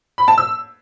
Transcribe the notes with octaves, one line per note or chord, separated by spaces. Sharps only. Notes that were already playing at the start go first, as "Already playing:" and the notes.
B5
A5
E6